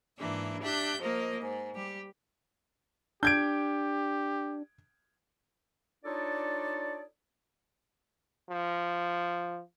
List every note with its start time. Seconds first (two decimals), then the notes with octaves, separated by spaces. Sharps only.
0.17 G#2 E3 A#3 D4 E5
0.61 D4 G4 E5 F#6 G6
1.00 F3 A#3 A#4 D#5
1.41 G#2
1.73 G3 G4
3.23 D4 G4 G6 G#6 D7
6.05 D4 D#4 F4 A4 C#5 D5
8.50 F3